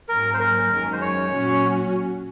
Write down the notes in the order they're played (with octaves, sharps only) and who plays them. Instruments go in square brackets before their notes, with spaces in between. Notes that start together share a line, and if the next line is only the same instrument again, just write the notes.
[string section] G#2 F#3 A#3 C#4 [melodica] A#4
[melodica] C5
A#4
[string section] F#2 D#3 G#3 C#4
[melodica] C5
C#5
[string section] A#2 F#3 C#4 F#4